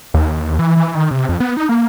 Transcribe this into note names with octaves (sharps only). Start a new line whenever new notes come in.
D#2
D#2
D#2
E3
E3
D#3
C3
F2
B3
D#4
A#3